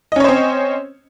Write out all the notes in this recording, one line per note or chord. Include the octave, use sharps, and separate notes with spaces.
C4 C#4 C5 C#5 D#5